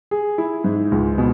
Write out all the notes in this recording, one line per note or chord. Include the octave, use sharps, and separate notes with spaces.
G#4
E4
G#2
C#2
B2